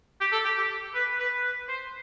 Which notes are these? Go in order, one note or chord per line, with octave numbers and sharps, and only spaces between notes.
G4
A4
G4
G4
B4
B4
B4
C5